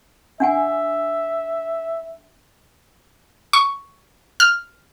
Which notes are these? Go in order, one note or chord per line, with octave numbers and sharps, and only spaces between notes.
D4 E5 F#5 G#5
C#6
F6